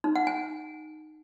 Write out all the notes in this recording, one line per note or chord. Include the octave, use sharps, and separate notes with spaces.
D#4
F#5
G#5